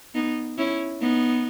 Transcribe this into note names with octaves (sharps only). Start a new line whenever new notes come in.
B3 D#4
C#4 E4
B3 D#4